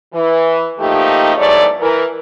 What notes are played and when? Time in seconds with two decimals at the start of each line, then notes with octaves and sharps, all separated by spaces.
0.14 E3
0.80 F3 A3 A#3 D#4 G4
1.37 E2 G#2 F#3 A3 C#5 D5
1.81 E3 A#4